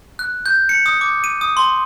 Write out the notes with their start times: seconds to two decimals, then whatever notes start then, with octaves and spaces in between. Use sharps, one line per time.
0.19 F#6
0.46 G6
0.69 C#7
0.86 D#6
1.01 D6
1.24 D#7
1.41 D#6
1.57 C6